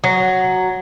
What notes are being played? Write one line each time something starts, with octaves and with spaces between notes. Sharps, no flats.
F#3